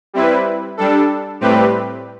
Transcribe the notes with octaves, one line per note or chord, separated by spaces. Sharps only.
G3 C4 E4 B4
G3 D4 A4
A2 G3 C4 G4 B4